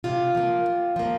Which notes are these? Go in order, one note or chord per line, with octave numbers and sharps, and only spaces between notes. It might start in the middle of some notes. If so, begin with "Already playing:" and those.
C3 F4
F3 A#3
C3
F3 A#3